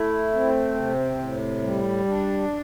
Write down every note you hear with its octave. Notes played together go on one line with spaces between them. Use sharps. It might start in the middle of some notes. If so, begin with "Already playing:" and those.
Already playing: A3 E4
C4
C3
A2
G3
D4